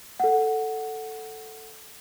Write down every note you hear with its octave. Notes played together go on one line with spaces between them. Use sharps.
A4 F#5